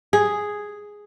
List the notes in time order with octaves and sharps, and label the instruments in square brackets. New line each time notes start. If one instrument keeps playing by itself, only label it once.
[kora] G#4